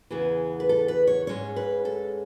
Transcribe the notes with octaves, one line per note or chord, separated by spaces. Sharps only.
E2 C#3 E3 B3 G#4
B4
A4
B4
C#5
G#2 G#3 C#4 C#5
B4
A4